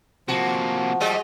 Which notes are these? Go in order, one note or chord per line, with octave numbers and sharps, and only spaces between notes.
C3 F3 A#3 F#4
G3 G#3 D#5